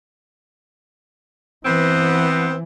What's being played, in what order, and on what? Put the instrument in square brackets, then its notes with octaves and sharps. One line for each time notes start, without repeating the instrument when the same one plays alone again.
[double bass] E3 [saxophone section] B3 C4